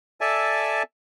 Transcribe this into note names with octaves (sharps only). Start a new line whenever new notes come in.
A4 D5 E5 G#5 A5